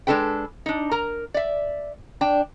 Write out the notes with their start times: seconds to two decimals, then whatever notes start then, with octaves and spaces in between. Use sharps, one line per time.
0.07 G#3 A3 D4 A4 B4 G5
0.66 D4 D#4
0.91 A#4 A#5
1.34 D5 E5
2.21 D4 G5